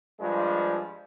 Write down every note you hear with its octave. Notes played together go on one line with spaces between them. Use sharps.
G2 F3 G#3